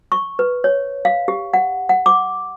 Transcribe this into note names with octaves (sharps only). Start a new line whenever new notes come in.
C#6
B4
C#5
F5
G4
F#5
F#5
D6